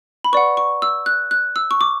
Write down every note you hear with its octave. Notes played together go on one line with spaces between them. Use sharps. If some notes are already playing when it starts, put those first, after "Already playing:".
B5
B4 D5 F#5 C#6
C#6
E6
F#6
F#6
E6
C#6
D6